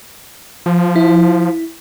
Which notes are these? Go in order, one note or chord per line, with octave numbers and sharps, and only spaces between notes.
F3
E4